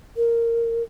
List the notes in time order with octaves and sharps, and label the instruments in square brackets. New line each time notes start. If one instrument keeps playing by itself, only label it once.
[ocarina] A#4